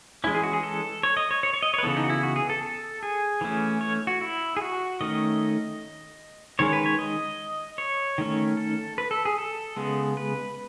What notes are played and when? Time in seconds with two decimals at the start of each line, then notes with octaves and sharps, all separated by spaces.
0.24 E3 G#3 C#4 E4
0.35 G#4
0.43 F#4
0.53 G#4
0.63 A4
1.03 C#5
1.17 D#5
1.31 C#5
1.43 C#5
1.54 C#5
1.63 D#5
1.74 C#5
1.78 B4
1.83 C#3 E3 B3 A4
1.97 D#4
2.04 F#4
2.10 E4
2.23 F#4
2.36 G#4
2.50 A4
2.63 A4
3.03 G#4
3.41 E3 A3 C#4
3.81 C#5
4.07 F#4
4.21 E4
4.57 G#4
4.61 F#4
5.01 D#3 A3 C#4 D#5
6.59 D#3 G#3 C#4 C#5
6.73 B4
6.86 C#5
6.99 D#5
7.78 C#5
8.18 D#3 A3 C#4
8.57 A4
8.98 B4
9.11 A4
9.25 G#4
9.38 A4
9.77 C#3 G#3 B3
10.17 B4